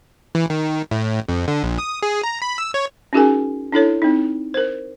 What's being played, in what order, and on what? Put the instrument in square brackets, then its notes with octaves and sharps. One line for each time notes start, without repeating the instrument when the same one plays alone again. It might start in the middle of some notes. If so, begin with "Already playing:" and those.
[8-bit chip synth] E3
D#3
A2
F2
D3
A#1
D#6
G#4
A#5
B5
E6
C#5
[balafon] C#4 D#4 F#4 G#4 A#4 G#5
D4 E4 A4 C#5
C4 D#4
A#4 C5